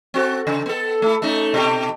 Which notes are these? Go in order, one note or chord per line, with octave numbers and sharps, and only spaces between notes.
C4 F#4 A4
C#3
B3 A4
A3 E4
A3 C#4 D#4
B2 G4